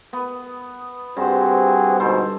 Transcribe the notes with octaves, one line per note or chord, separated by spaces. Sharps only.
B3
G2 C4 F#4 G#4 C5
D2 G#2 B2 A4 C5